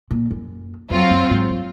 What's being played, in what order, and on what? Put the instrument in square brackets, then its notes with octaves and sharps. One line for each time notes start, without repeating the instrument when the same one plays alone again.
[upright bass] A#2
F#2
[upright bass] F2 [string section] F#3 C4 F4
[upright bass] F#2
G#2
F#3